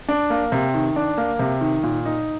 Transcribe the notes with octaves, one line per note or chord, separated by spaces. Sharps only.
D4
A#3
C3
D#3
D4
A#3
C3
D#3
A#2
D#4